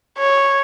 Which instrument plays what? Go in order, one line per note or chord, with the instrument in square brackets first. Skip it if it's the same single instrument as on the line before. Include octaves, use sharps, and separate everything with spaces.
[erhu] C#5